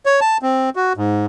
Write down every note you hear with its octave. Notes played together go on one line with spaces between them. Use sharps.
C#5
A5
C4
F#4
G#2